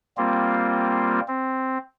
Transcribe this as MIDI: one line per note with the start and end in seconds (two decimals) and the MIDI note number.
0.17 1.20 55
0.17 1.20 58
0.17 1.20 60
0.17 1.20 65
1.28 1.78 60